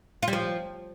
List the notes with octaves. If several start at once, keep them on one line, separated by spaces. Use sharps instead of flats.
F4
G3
F3